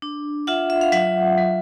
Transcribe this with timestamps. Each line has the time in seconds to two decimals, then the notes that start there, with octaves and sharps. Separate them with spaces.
0.02 D4
0.47 F4 E5 F#5
0.70 E5
0.81 F5
0.92 F#3 E5 F#5
1.37 F#3